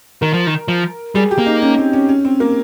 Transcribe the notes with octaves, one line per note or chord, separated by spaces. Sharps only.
D#3 A#4
F3
D#3
F3
G3 G#4
G4
A#3
D#4
C#4
C4
C#4
C#4
C4
A#3